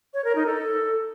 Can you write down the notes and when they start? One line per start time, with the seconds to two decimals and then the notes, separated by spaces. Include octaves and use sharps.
0.14 C#5
0.25 A#4
0.35 D#4
0.46 A4